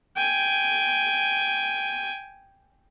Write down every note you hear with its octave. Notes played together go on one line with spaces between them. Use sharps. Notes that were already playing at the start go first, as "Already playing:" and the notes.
G5 G#5